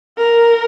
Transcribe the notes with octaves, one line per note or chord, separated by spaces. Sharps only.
A#4